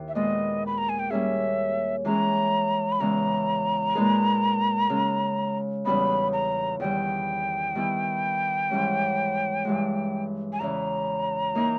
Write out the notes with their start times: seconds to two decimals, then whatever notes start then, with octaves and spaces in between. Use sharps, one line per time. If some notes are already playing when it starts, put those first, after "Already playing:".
Already playing: D#2 D#3 E4
0.08 E5
0.15 A#2 G#3 B3 D#5
0.66 B5
0.78 A#5
0.89 G#5
0.99 G5
1.10 G3 A#3 C#4 G#4 E5
2.05 E3 G#3 C#4 E4 G#4 A#5
2.92 B5
3.00 E2 C#3 E3 G#3 B3 A#5
3.95 A#2 G#3 D#4 G#4 B4
4.90 C#3 G#3 C#4
5.85 E2 C#3 G3 B3 D#4 B5
6.33 A#5
6.80 E2 D#3 G3 G5
7.75 D#3 G3 B3 E4
8.70 G#2 E3 G3 C#4
9.65 G2 E3 G#3
10.53 G#5
10.59 E2 C#3 E3 A#5
11.55 E3 A#3 D#4 A#4